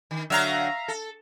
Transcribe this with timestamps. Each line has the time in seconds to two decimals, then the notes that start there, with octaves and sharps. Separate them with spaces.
0.11 D#3
0.30 D3 F#3 E5 F5 A#5
0.88 A4